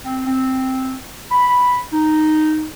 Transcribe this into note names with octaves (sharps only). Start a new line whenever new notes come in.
C4
C4
B5
D#4